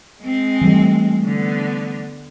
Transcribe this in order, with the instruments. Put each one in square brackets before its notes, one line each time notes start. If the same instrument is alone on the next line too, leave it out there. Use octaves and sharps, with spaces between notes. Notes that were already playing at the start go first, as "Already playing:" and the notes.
[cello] G#3 C4
[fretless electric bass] E3 G3 A3
[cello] D3 B3